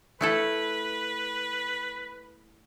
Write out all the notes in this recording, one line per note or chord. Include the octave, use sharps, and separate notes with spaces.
A3 E4 A4 B4